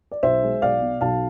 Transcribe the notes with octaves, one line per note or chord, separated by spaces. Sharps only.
D5
B1 C5 E5
G#3
B1 D5 F5
B2
B1 F5 A5